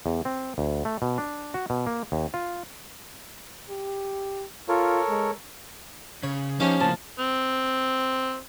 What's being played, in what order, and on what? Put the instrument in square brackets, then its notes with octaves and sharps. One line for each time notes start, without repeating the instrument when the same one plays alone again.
[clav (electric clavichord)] E2
C4
D2
A3
B2
D4
F#4
B2
A#3
D#2
F4
[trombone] G4
[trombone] F4 [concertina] A4 A#4 C#5
[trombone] G#3
[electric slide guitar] C#3 [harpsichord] C#5
[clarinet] F3 [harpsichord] A#3 G4 C5 [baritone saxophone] C#4 [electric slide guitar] D#4
[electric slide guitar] A2 C#3 A#3 [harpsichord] F3 [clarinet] A5
[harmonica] C4